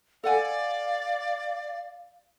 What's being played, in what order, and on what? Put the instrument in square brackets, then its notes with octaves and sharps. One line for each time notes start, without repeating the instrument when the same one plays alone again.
[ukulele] A4 F#5 G#5 [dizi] D5 [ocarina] F5